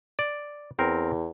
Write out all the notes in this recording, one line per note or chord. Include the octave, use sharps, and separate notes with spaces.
D5
E2 C4 A#4